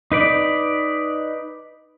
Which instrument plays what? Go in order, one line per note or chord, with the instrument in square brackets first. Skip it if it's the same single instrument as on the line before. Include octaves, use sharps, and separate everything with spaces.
[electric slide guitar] D#4 B4 D5